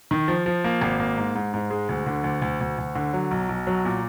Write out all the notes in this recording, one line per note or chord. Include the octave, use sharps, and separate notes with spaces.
D#3
F3
F3
A#3
G#1
A#3
G#2
G#2
G#2
G#3
D2
D3
D2
D2
D2
D2
D3
F#3
B1
B1
F#3
A#2